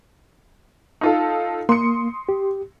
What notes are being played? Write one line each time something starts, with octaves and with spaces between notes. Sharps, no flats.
D#4 F4 A4
A#3 C6 D#6 C#7
G4